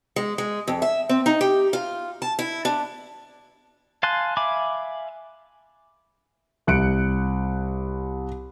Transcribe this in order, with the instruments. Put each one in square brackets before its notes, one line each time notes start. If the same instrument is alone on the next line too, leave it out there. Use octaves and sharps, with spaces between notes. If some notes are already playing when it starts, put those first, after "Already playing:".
[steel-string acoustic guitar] G#3
G#3
F2
E5
C4
D#4
G4
F4
A5
E4
D4
[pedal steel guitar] F5 G#5 A5 C6 F#6
E5 F5 G#5 B5 D6
[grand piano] C2 F#6 C#7 D7